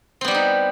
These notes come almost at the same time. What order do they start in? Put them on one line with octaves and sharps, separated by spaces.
C4 B3 G3 G4 D#4